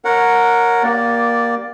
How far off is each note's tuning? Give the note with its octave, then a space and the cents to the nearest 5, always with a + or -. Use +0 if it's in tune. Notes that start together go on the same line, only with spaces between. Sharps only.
A#4 +0 C#5 +0 F#5 -15
A#3 +15 G4 -15 D5 +0